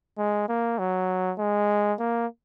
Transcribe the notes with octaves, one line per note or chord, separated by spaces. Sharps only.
G#3
A#3
F#3
G#3
A#3